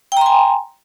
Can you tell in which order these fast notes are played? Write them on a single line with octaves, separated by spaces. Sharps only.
G5 A#5 C6 G#5